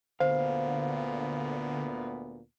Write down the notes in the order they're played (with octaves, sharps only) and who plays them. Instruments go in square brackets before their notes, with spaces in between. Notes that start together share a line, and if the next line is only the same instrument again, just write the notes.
[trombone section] D2 A#2 B3 [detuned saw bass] D3 [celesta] C5 [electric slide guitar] F5